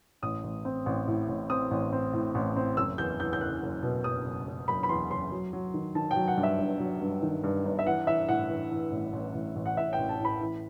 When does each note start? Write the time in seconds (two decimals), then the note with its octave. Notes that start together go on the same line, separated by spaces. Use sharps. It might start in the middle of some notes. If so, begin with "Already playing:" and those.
0.22 A1 D#6
0.44 A1
0.65 C4
0.86 A1
1.08 A2
1.29 A1
1.50 C4 D#6
1.71 A1
1.93 C4
2.13 A2
2.35 A1
2.56 C4
2.77 F#1 E6
2.98 E2 G6
3.20 E2 G6
3.33 G6
3.41 F#1 F#6
3.62 F#1
3.83 B2
4.04 F#1 D#6
4.26 F#1
4.47 F#1
4.68 F#1 B5
4.83 B5
4.89 E2 C6
5.10 F#1 C6
5.32 F#3
5.53 F#3
5.74 D#3
5.95 D#3 A5
6.11 G5
6.16 F#3
6.28 F#5
6.37 G2
6.43 E5
6.59 G1
6.80 F#3
7.01 G2
7.22 D#3
7.44 G2
7.65 G1
7.79 E5
7.86 E3 F#5
8.07 E3 E5
8.29 A2 F#5
8.50 E3
8.71 E3
8.92 A1
9.13 A1
9.34 A1
9.56 A1
9.66 F#5
9.77 A2 E5
9.93 G5
9.98 A1
10.09 A5
10.20 A2 B5
10.40 E3